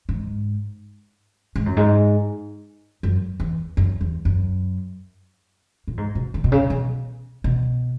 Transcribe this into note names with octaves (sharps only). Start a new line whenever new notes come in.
G#2
G#2
F#2
G#2
F#2
E2
F#2
E2
F#2
A#2
G#2
B2
D#3
B2
C#3
B2
B2